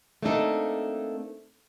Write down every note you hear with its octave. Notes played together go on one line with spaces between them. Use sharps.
A3 A#3 C4 D4 D#4 A4